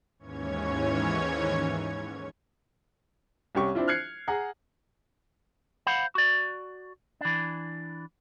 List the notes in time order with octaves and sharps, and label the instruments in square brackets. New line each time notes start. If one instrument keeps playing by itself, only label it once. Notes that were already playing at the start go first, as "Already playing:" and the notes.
[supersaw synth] D#2 G#2 E3 C#4 C#5 G#6
[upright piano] C2 C#4 G4 C#6
C4 D4 E4 F4
F6 F#6 G#6 C7 C#7
G#4 F#5 A#5
[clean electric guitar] C5 F5 F#5 B5
F#4 D5
E3 D4